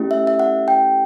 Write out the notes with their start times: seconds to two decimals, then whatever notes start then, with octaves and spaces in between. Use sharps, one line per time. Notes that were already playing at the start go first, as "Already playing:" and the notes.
Already playing: A3 C#4 E4 G4
0.11 E5
0.27 E5
0.39 F#5
0.68 G5